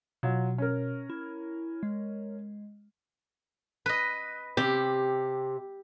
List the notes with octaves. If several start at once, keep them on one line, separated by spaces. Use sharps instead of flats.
B2 F#3 F4
C#4 A#4
E4
G#3
B4 D#5
C3 G4